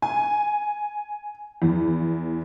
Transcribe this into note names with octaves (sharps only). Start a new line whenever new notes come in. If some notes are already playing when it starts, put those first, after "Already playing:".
G#5
E2